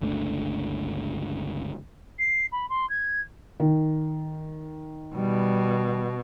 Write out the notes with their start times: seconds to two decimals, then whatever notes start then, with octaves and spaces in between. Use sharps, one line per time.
0.01 G1 C#2 A3 D4
2.19 C7
2.52 B5
2.69 C6
2.90 G#6
3.60 D#3
5.15 B2 G3